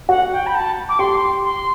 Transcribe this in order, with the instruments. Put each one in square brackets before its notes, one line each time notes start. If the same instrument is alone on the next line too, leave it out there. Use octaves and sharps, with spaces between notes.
[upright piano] F#4 [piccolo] F#5
[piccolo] G5
B5
A5
D6
[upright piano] G4 [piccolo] C6
[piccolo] C6